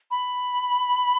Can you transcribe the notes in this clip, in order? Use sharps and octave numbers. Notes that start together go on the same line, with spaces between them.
B5